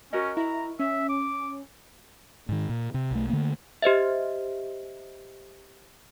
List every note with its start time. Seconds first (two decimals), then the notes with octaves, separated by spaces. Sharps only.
0.13 C#4 F#4 A#4 D#5
0.37 E4 A#5
0.79 C#4 E5
1.09 D6
2.49 G#2 D#3
2.69 A#2
2.94 C3
3.11 B1 A3
3.30 D3 A3 A#3
3.82 G4 C5 D#5 E5